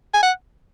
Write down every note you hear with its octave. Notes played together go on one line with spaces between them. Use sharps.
G#5
F#5